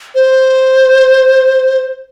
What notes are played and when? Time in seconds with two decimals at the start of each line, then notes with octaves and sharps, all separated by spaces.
0.15 C5